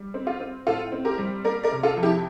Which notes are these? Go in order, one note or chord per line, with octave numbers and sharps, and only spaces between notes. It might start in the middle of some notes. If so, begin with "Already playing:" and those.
Already playing: G3
C4
F4
C4
A2 F4 A4
C4
G4 A#4
G3
A#3 A#4 D5
A#4 D5
C3
F4 A4
F2
E4 G4